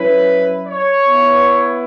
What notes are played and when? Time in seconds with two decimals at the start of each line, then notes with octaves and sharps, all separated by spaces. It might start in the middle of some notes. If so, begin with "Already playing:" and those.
Already playing: F#3 C#4 E4 B4
0.67 C#5
1.05 B3 E4